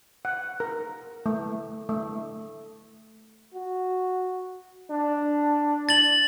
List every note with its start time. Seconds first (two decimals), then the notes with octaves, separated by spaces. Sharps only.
0.25 F#5
0.60 A#4
1.26 A3
1.89 A3
3.54 F#4
4.90 D4
5.89 A6 F#7